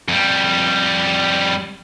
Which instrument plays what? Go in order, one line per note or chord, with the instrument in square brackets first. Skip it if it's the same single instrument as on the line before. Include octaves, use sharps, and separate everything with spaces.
[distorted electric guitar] F2 G3